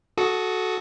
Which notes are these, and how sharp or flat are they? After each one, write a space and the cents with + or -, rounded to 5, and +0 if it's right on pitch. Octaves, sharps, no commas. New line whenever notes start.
F#4 +0 A4 -15 D#6 +10